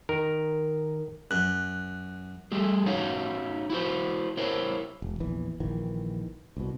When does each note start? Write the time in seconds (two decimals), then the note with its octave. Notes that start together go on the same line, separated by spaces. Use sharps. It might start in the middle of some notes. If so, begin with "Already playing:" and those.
0.09 D#3 A#4
1.31 F#2 F#6
2.52 G3 A3 G#4
2.86 C#4 D#4 F#4 C#5 F5
3.70 E4 F#4 C5
4.37 E4 A#4 C5 C#5
5.02 E1
5.20 A#1 E2 E3
5.60 A#1 D#3 E3
6.57 C2 B2